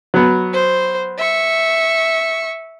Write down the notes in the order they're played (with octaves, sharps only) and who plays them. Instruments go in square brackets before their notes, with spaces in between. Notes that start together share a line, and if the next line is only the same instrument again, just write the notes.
[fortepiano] F#3 B3
[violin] C5
E5 C#6